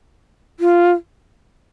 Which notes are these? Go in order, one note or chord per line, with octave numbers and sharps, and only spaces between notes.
F4